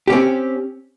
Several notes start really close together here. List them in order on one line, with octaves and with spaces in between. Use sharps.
G4 C#4 C4